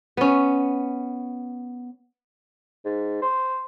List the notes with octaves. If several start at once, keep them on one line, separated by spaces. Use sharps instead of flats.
B3 C#4
G#2
C5